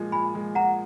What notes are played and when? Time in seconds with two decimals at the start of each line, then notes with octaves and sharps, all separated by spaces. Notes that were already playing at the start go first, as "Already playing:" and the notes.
Already playing: A#2 F3 G#3
0.12 A#2 G#5 B5
0.34 F3 G#3
0.55 A#2 F#5 A#5